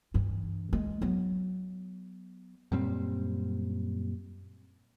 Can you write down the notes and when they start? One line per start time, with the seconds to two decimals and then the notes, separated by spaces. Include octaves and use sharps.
0.14 G2 E3
0.73 G#3
1.02 F#3 B3
2.72 F#2 A#2 G3 C4